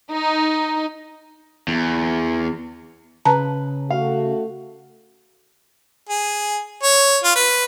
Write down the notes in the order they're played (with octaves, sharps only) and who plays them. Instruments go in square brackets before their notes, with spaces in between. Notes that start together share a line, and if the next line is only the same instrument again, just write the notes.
[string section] D#4
[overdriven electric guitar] E2
[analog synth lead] C#3 [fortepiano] B4 [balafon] A5 A#5
[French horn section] A3 F#4 [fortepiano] F5
[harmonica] G#4
C#5
F4
B4